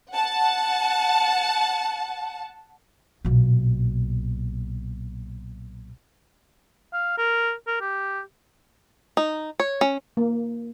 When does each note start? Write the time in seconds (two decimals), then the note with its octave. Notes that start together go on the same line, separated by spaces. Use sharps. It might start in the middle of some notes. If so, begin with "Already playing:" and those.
0.13 F#5 A5
3.25 B1 A#2
6.94 F5
7.18 A#4
7.67 A#4
7.81 G4
9.17 D#4
9.60 C#5
9.81 C#4
10.17 A#3